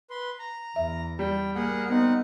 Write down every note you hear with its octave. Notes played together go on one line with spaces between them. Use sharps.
B4 C6
A#5
E2 E5
G3 G5
A#3 G#4 F#5
B3 C4 D#4 F#5